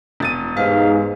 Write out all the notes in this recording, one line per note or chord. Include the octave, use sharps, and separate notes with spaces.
E1 A6 D#7
G#2 G#3 G4 B4 F5